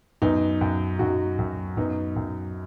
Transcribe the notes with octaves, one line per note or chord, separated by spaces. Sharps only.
F#2 B3 D#4
F#2
F#2 D#4 F#4
F#2
F#2 B3 D#4
F#2